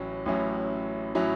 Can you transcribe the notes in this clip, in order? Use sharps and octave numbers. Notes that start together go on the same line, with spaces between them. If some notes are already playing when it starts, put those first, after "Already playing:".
Already playing: A1 A2 F#3 C#4 E4
A1 A2 F#3 C#4 E4
A2 F#3 C#4 E4